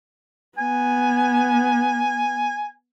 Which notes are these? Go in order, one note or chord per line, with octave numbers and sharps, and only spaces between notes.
B3 G#5